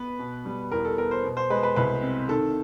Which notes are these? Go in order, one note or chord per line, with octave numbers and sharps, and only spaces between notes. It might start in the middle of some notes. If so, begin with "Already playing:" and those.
Already playing: B3 B4
B2
G3
E2 A#4
A4
B3 A#4
C5
B2
C5
G#3 B4
B4
C2 B4
C4
D#3 A4